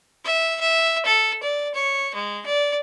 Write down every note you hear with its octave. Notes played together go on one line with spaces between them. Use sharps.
E5
E5
A4
D5
C#5
G#3
D5